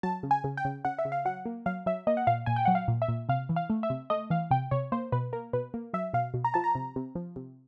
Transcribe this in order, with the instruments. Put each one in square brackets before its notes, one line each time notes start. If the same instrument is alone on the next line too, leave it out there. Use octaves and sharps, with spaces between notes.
[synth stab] F#3 A5
C#3
G#5
C#3
G5
C#3
C#3 F#5
E5
C#3
F5
F#3 F#5
A#3
F#3 F5
F#3 E5
A#3 D#5
F#5
A#2 F5
A#2 G#5
G5
F#3 F#5
F5
A#2
E5
A#2
C3 F5
E3
F5
A3
E5
C3
A3 D#5
E3 F5
C3 G5
C3 C#5
A#3 C5
B2 B4
A#3 A#4
B2 B4
A#3
F#3 E5
B2 F5
B2
A#5
F3 A5
A#5
C3
C3
F3
C3